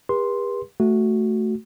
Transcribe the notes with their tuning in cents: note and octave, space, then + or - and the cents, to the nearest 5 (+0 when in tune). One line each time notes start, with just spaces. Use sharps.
G4 +45 B4 -40 C6 +0
A3 +0 F#4 +0